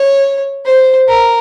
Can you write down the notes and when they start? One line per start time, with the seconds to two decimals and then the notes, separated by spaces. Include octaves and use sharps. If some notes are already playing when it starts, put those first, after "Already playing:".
Already playing: C#5
0.66 C5
1.08 A#4